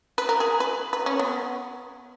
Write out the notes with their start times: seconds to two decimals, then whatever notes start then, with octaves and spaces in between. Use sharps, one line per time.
0.18 B4
0.29 A#4
0.40 G#4
0.60 B4
0.93 B4
1.06 C#4
1.19 B3